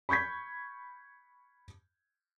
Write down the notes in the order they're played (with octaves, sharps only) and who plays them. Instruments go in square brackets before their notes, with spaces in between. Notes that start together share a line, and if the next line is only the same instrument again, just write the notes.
[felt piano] B5 C#6 G6 G#6 B6